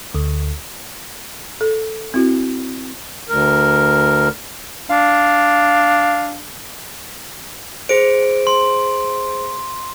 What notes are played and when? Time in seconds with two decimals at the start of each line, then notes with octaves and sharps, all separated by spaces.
0.14 D2
1.61 A4
2.14 C4 E4 F#4
3.29 D2 A#4
4.90 D4 F5
7.89 G#4 C5 D7
8.47 C6